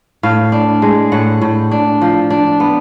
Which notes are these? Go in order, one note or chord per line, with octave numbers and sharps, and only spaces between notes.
A2 F5
D4
G#3
A2 F#5
A2
D4
F3
D4
B3